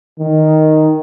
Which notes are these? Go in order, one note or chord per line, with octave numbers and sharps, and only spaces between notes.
D#3